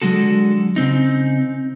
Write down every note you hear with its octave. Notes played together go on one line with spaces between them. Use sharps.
D3 F#3 G#3 F#4 A4
C#3 C4 D#4